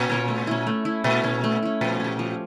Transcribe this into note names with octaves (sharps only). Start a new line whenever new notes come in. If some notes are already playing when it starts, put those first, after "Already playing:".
Already playing: A#2 C#4
F4 A#4 C#5
A3
C#4 E4
A3
C#4 E4
A#2 A3
C#4 E4
A3
C#4 E4
A#2 F3
C#4 G4
F3